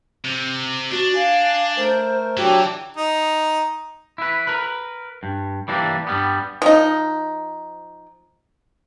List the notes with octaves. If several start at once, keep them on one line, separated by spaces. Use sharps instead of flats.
C3
D4 F#4
F5 G#5
A3 A#4 C5
E3 F#3 D4 F#4 G4
D#4
E4 B4
A#4 B4
G2
E3 G3 A#3 D4
G2 G3 B3
F3 D#4